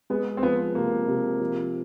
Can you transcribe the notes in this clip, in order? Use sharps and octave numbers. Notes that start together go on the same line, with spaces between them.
G#3 B3
C4
F3 B3
C3 A#3
C3
F3